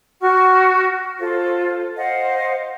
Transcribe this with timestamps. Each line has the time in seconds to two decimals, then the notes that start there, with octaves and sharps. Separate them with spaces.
0.21 F#4 F#5 C#6 F6
1.20 F4 A4 C5
1.97 C5 D#5 F5 F#5